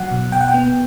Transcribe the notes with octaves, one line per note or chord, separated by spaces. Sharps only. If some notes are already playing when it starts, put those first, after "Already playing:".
Already playing: F#3 F#5
B2
B2 G5
F#5
G5
B3